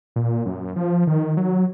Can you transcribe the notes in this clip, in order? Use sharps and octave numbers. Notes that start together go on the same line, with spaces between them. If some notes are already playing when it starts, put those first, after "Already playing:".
A#2
F#2
F3
D#3
F#3